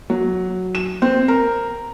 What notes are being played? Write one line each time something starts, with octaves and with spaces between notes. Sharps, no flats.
F#3
E7
C4
A#4